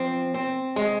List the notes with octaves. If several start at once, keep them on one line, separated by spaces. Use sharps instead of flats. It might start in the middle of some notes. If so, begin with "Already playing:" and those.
Already playing: F3 C4
C4
G#3